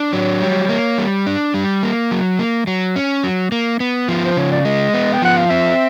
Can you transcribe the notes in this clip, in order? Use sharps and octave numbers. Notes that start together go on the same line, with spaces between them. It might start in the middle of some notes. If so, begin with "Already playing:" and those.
Already playing: D4
F#3 C#5
G3
A#3
G3
D4
G3
A#3
F#3
A#3
F#3
C#4
F#3
A#3
B3
F3
C5
C#3 C#5
D5
G#3 D#5
B3
G5
F3 F#5
F5
C4 E5